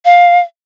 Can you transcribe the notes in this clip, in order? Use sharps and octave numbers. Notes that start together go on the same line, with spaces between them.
F5